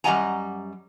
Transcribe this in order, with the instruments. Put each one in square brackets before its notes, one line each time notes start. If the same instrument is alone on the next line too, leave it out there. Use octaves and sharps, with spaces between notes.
[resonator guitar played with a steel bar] F#2 G3 D#5 F#5 G#5 A#5